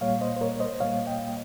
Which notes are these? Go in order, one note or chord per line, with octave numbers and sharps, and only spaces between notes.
A#2 G3 A#3 C#5 F5
C5 D#5
C5
A#4 C#5
C#5
C5 D#5
A#2 G3 A#3 C#5 F5
D#5 G5